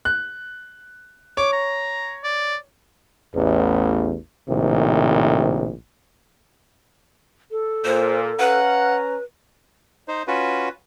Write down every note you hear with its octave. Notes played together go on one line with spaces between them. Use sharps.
F#6
C#5 D6
A#5
D5
A1 E2
A#1 A2 C3 D#3
A4
A#2 C5
C#4 B4 F5 F#5 A#5
D#4 C5
C#4 F4 F#4 B4